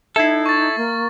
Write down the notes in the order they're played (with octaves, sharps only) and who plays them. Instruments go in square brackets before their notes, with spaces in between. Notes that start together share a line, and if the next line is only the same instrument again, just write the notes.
[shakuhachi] D#4 [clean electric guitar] E4 A4 [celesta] E5 G#6 C7
[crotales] C#6 A6
[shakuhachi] A#3